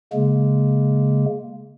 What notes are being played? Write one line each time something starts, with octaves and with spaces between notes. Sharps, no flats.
C#3 G#3 A#3